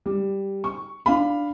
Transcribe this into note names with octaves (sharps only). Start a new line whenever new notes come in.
G3
C#6
D4 F5 B5